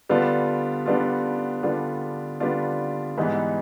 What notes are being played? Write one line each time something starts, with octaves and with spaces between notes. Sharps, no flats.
D3 G3 B3 D4 F4
D3 G3 B3 D4 F4
D3 G3 B3 D4 F4
D3 G3 B3 D4 F4
G#2 E3 G3 B3 D#4